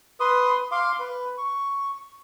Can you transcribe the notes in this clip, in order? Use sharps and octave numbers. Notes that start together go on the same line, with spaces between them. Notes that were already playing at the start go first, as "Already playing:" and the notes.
B4 C6 D#6
F5 C6 D6
B4
C#6